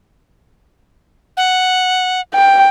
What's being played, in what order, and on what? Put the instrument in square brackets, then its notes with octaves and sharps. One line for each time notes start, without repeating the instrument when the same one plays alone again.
[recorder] F#5
[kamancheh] G5